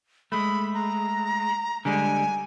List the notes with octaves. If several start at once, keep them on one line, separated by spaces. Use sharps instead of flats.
G#3 A3 B5
A#5
D3 G3 G#3 G#5